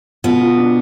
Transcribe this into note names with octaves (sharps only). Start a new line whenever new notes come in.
B2 B3 F4
F4
D4